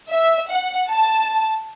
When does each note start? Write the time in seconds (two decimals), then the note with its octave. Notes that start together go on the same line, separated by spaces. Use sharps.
0.11 E5
0.50 F#5
0.89 A5